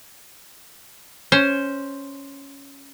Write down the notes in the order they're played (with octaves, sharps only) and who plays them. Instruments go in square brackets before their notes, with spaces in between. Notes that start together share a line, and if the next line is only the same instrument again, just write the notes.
[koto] C#4 C5